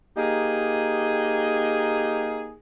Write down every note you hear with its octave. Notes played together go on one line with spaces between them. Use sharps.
A#3 D#4 G4 G#4